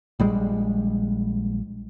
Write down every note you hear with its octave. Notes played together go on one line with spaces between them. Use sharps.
A#1 G3 G#3